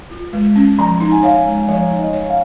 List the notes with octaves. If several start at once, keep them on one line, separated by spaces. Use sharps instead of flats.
F4
G#3
C#4
F3 A#5
D#4
G#5
C#5 F5
G#3
F3 C#5
D#4
D#5
C#5
F5